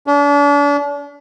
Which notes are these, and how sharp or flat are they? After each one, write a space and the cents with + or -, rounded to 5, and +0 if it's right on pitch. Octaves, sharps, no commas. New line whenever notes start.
D4 -40